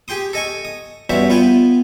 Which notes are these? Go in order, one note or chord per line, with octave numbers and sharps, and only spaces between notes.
G4 G#4 G5 C6 D#6
A4 D#5 G#5 C#6
D#6
E2 G2 C#4 F#4 C5 E5
B3 F4 G5 G#5